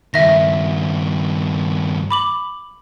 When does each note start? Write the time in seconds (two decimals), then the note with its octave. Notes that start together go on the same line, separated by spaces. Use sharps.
0.14 G2 D#3 E5 A#6
2.11 B5 D6 F#7